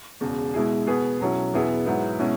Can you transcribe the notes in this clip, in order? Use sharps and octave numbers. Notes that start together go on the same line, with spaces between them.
E1 E2 C#3
B2 G#3 E4 G#4
B2 B3 G#4
B1 B2 F#3 C#4 E4
E2 B2 B3 E4 G#4
G#2 F#3 B3 E4
B2 G#3 C#4 E4